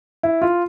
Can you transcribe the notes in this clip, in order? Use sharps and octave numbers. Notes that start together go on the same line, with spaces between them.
E4
F4